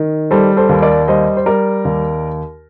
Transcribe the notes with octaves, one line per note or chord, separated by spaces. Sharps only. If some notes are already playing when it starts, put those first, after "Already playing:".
Already playing: D#3
G3 A4 C5
A4 C5
D#2
A#4 D5
G3 C5 D#5
C5
G3 A#4 D5
D#2